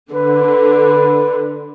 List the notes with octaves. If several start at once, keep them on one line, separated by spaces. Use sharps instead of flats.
D3 B4